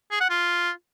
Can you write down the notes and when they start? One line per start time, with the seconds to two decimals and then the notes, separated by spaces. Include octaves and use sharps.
0.11 G#4
0.21 F#5
0.30 F4